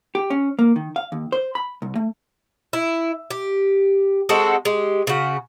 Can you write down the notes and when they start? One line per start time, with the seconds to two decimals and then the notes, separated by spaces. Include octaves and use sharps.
0.15 G4
0.30 C#4
0.59 A#3
0.76 D#3
0.96 F5
1.12 D#2
1.32 C5
1.55 B5
1.82 C2
1.95 A3
2.73 E4
3.31 G4
4.29 G#3 C4 F#4 A4
4.65 G#3 G4
5.07 C#3 F#4